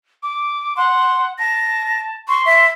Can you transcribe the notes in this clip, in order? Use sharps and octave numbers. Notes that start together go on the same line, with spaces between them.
D6
F#5 C6
A5 A#6
C6 C#6
E5